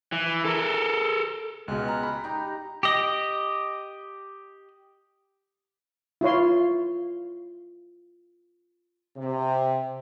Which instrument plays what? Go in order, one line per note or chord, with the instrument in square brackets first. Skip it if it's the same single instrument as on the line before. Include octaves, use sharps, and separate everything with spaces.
[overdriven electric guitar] E3
A4 A#4
[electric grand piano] C#2 B2 [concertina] G#3 F6 F#6
[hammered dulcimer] A#5
[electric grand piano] B5
[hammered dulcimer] D#4 G4 [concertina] A#5
[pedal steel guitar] G4 D#5
[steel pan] E4 F4 C#5 C6
[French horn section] C3